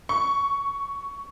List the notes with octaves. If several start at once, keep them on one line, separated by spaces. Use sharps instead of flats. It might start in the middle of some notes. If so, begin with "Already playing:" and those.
C#6